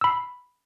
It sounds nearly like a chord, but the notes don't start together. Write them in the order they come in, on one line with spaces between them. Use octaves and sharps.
E6 B5 C7